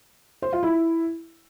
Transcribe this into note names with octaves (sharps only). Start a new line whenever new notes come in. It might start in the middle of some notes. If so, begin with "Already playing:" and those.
C5
F4
E4